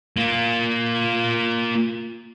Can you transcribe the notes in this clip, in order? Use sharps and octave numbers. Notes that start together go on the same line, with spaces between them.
A#3 F4